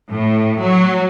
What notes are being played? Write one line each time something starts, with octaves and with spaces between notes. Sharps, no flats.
A2
F#3